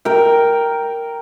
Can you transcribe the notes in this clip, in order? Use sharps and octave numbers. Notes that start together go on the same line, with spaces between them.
A#4 G5